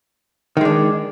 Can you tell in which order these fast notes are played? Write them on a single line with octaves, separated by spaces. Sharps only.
D#3 G#3 D4